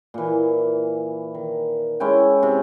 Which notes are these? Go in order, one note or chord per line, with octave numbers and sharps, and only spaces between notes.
A#2 E3
D#3
G#3 C#4 E4 G5
C3